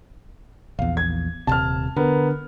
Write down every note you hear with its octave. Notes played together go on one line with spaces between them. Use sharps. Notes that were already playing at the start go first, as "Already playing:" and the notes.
A#1 E2 F5
G#6
D#1 G#1 C3 A5 F6
D3 B3 A#4